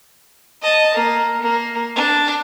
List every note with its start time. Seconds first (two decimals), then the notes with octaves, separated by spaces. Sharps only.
0.63 D#5 A5
0.95 A#3
1.41 A#3
1.96 D4